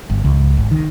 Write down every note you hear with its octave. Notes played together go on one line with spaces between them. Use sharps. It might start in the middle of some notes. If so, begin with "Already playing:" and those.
G1
C#2
G#1
D#3